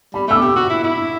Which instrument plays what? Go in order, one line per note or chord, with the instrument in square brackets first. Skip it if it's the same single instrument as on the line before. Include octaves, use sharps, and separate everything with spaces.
[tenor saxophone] G3 [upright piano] B5
[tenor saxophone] A3 [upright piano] E6
[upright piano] D6
[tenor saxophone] G4
F#4
E4
E4